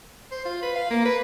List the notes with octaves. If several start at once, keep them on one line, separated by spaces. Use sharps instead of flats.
C5
F4
B4
F5
A#3
B4